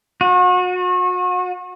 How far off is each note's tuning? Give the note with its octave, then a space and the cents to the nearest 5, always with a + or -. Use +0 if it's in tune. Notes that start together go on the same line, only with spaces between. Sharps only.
F#4 -35